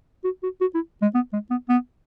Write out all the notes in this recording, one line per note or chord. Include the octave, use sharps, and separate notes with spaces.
F#4
F#4
F#4
E4
G#3
B3
G#3
B3
B3